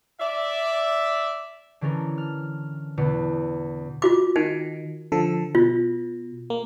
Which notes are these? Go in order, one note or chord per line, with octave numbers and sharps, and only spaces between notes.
D5 E5
D3 E3 C#4 A4 A#4
F6
E2 B2 D3 B3
F4 F#4 D6
D#3 D#4
D3 F3 A4
B2 F4
A#3